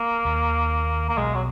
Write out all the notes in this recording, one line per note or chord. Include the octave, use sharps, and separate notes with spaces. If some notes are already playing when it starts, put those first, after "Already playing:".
Already playing: A#3
D#2 D#3
A#3
B1 B2 G#3
F#3